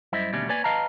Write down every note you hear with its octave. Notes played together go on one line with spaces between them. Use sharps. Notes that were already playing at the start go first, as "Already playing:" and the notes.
F#2 G3 E4 C5 D#5 E5
D#2 B2 D3 G3 A3 C#4
A#3 B4 C#5 D5 G#5
B4 D#5 F5 A5 A#5